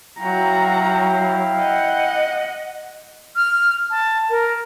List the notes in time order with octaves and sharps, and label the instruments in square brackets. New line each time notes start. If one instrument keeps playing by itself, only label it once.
[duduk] F#3 [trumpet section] E4 F5 G5 [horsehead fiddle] F#4 A#5
[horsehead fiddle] D#5 F#5
[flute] F6
A5
A#4